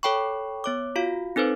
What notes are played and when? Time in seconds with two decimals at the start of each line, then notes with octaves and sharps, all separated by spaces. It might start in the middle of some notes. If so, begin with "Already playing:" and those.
0.03 A4 C#5 G5 B5 C#6
0.64 B3 C#5 D6
0.96 F4 F#4 F5
1.36 C4 D#4 A4 B4 C5